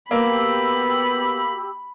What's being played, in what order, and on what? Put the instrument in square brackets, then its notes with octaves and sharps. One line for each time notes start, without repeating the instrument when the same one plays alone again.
[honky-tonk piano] A#3 [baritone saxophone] B3 [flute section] F#4 G4 E6 [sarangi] B5